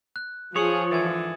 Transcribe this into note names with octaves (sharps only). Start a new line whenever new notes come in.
F#6
F3 G#4 C#5 D#6 C#7 F#7
G#2 D3 E3 G#6 A6